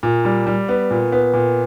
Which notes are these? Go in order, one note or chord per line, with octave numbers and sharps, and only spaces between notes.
A#2
G3
G3
B3
A#2
B3
A#2